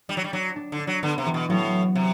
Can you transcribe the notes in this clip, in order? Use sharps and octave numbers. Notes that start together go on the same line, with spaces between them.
G3 D4
F#3
G3
F#3 D4
D4
D3
D4
F#3
D3 B3
C3
E3
B2
A2 F#3
C3